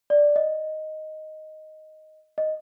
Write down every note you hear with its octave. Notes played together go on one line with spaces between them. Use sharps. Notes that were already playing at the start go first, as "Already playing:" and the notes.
D5
D#5
D#5